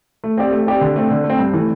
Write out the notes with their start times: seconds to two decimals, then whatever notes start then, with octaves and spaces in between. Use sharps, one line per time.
0.24 A3
0.37 C4 G4 D5
0.52 A3
0.67 C4 G4 D5
0.81 D3
0.96 A3 C4
1.10 D3
1.24 A3
1.30 C4
1.39 G2
1.53 E3 A3